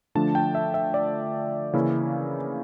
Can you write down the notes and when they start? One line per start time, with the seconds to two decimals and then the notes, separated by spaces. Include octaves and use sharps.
0.15 D3 F3 A3 D4 A5
0.35 G5
0.55 E5
0.74 E5
0.94 D5
1.73 C#3 E3 A#3 C#4 E4